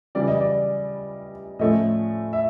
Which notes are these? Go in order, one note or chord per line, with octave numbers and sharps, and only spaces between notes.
C#3 E3 G3 D5
D#5
D5
A2 F3 A3 C#4 D#5
E5